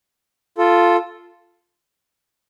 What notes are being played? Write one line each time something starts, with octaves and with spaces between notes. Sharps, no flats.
F4 A4